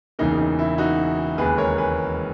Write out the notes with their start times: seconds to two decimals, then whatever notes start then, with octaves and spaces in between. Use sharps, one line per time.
0.19 E1 E2 C#3 E3 A#3 D#4
0.38 D#4
0.59 E4
0.78 D#4 F#4
1.38 E1 D#2 C#3 E3 G#3 G#4 B4
1.58 A#4 C#5
1.78 G#4 B4